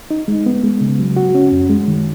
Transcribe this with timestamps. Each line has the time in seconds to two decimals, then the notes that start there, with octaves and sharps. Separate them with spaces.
0.11 D#4
0.28 G#3
0.46 B3
0.64 G#3
0.81 C#3
0.99 F#3
1.16 F#4
1.35 C#4
1.52 F#2
1.70 G#3
1.88 D#3